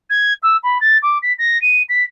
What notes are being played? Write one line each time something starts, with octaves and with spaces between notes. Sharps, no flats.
G#6
E6
B5
A6
D6
B6
A#6
D#7
B6